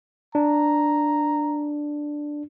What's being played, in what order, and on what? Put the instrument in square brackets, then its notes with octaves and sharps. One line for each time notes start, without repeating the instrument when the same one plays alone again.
[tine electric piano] D4 [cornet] A#5